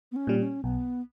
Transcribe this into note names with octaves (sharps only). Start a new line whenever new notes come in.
B3
C#4
A#2 G3
C#4
B1 B3